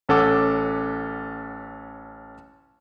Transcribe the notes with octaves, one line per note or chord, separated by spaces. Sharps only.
A1 C#4 A4 F#5 D6